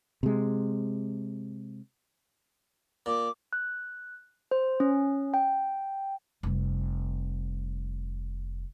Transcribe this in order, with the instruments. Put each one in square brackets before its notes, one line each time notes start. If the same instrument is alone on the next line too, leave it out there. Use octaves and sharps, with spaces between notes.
[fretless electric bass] C3 G#3
[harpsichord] A#2 [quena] D6
[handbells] F#6
C5
C#4
G5
[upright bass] F1 G3